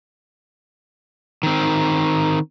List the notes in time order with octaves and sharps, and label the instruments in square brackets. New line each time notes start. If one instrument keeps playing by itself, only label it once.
[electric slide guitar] D#3 C4